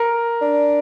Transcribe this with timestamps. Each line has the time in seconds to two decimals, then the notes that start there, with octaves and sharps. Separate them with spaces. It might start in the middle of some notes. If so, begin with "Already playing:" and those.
Already playing: A#4
0.42 D4